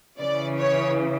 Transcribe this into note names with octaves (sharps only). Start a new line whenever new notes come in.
C#3 E3 D5
C#5